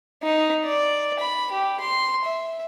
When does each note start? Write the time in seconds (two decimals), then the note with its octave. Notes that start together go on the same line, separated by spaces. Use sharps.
0.24 D#4
0.65 D5
1.19 B5
1.52 G4
1.81 C6
2.25 E5